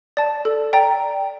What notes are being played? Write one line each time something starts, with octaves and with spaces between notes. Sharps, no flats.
D5 A5
A4
D5 G5 A#5